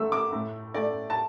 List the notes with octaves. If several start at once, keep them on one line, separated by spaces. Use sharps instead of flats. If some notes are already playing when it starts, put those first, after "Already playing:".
Already playing: A3 E6
D6
A2
A3 D5
A5